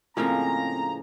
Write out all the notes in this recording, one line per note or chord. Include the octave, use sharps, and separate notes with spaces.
A2 C#3 F3 G#3 A#3 C4 F5 A#5